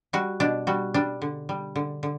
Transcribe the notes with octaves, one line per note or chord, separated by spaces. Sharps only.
G3 F#4
B2 D4
G3 F#4
G3 D4
D3
G3
D3
D3